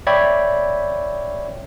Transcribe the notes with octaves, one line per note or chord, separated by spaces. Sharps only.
C#5 D5 E5 G5 B5 G#6